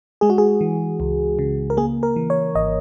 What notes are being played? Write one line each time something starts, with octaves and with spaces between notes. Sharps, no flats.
G#3 G#4
F#4
G#4
E3
C#2
C#3
A#4
A#3 G#4
A#4
E3
C#5
G#1 D#5